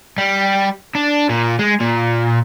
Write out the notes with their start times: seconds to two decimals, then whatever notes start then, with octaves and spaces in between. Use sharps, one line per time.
0.18 G3
0.95 D4
1.29 A#2
1.59 G#3
1.80 A#2